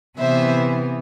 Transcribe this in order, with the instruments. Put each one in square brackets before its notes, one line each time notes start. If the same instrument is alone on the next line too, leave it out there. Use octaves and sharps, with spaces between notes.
[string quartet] C3 E3 B3 C5 E5